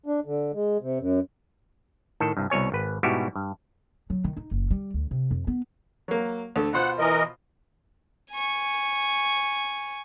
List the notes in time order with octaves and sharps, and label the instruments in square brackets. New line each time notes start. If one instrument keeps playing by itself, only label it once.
[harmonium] D4
D3
G#3
C3
F#2
[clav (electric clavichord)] A2 D#3 A4
C2 G2
C2 B2 C#5 G#5
G#1 B4
G#2 B2 G3 E4 F#4 G4
G2
[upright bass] F#3
D#3
D#4
F#1
G3
D2
C3
F2
B3
[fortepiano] F#3 A#3
D2 A4
[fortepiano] B2 F4 C5 [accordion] F#5
[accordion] E3 A#4 D#5
[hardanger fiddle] G#5 C#6